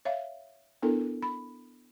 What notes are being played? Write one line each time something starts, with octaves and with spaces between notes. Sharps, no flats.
C#5 E5 F5
B3 D4 E4 A4 A#4
B5